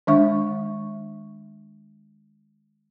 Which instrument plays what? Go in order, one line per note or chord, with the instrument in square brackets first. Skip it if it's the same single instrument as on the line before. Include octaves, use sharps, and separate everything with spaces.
[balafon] D#3 G#3 D4 E5 C#6